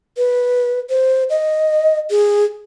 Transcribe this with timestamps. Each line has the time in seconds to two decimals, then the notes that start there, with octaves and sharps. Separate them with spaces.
0.17 B4
0.90 C5
1.30 D#5
2.10 G#4